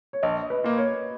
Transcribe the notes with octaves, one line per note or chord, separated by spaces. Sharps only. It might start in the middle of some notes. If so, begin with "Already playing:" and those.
C#5
A#1 D#5
B4
A#2 A#3
C#5